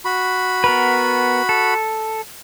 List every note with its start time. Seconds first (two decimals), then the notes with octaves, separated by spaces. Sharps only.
0.05 F#4 B5
0.64 B3 A#4 B4
1.49 A4